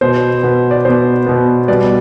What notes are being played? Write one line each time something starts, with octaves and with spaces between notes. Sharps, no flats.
B2 B3 C5
B2 B3
D5
B2 B3 C5
B2 B3
B2 G3 B3 D5